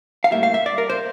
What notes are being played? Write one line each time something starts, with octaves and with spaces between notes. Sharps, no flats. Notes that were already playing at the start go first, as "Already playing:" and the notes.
F5
A2 G3 A#3 E5
F5
E5
D5
A#4
C5